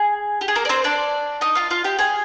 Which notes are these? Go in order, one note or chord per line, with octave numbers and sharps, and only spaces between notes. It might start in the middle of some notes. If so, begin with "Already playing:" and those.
Already playing: G#4
G4
G#4
A#3 A#4
D5
C4 C5
D4 D5
D#4 D#5
F4 F5
F4 F5
G4 G5
G#4 G#5